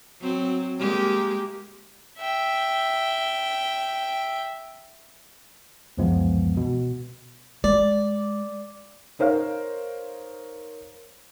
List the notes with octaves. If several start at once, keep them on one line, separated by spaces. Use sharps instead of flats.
F#3 C4
G#3 A#3 G4
E5 G5
C#2 F#2 E3 F3 G#3 B3
B2
G#3 D5
D#4 A#4 C5 C#5 F5